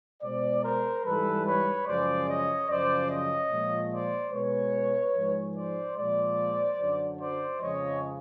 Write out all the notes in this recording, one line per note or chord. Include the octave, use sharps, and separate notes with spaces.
B2 G#3 C5 D5
A#4 C5
G#2 E3 G3 A4 B4
B4 C#5
F#2 C#3 F3 G#3 C5 D5
C#5 D#5
F#2 C#3 F3 C5 D5
C#5 D#5
A#2 F3 G#3
C5 D5
B2 G#3 B4 C#5
G#2 F3 G#3
C5 D5
A#2 F3 G#3 C5 D5
F#2 D3 F#3
C5 D5
F2 C#3 F3 G#3 C#5 D#5